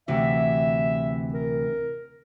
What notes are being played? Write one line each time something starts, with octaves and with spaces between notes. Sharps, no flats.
D2 C3 E3 E5
A#4